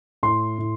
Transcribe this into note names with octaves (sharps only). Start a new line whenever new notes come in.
A2 C6
A2